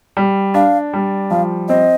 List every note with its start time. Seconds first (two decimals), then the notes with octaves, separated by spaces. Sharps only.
0.17 G3
0.54 D4 F5
0.93 G3
1.31 F3 F5
1.69 C4 D#5